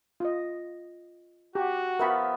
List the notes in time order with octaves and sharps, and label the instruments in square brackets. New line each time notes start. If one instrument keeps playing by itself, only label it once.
[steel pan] F4 D#5
[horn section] F#4 [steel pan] G4
[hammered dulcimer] F3 B3 E5 [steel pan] A#4 B5 C#6